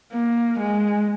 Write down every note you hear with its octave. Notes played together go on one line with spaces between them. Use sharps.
A#3
G#3